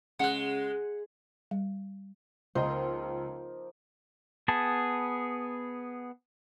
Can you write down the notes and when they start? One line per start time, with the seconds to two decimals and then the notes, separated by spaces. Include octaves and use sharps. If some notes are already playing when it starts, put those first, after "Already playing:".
0.19 C#3 G#3 F#5 F#6
1.51 G3
2.55 C#2 F3 A#3 D#4 C5 D#5
4.48 B3 G#4 A5 B5